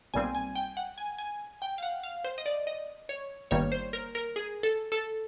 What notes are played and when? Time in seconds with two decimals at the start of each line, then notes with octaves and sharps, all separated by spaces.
0.14 B1 A#2 G3 C4 G#5
0.35 G#5
0.55 G5
0.77 F#5
0.98 G#5
1.18 G#5
1.62 G5
1.78 F5
1.83 F#5
2.03 F5
2.24 C5
2.38 D#5
2.46 D5
2.67 D#5
3.09 C#5
3.51 G1 G2 D#3 G3 A#3 C#5
3.72 C5
3.93 A#4
4.15 A#4
4.36 G#4
4.63 A4
4.92 A4